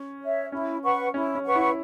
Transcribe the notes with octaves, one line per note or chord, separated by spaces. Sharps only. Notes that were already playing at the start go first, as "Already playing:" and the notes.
Already playing: C#4
C#5 E5
C#4 E4
B4 F#5 C#6
C#4 E4
C#4
B4 F#5 C#6
E4